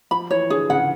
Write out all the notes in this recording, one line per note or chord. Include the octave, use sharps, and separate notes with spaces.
F3 B5
E3 C#5
D3 G#4
C#3 F#5